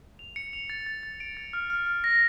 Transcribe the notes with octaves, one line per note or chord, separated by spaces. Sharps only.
F7
C#7
F7
A6
A6
A6
D7
A6
F6
F6
F6
A#6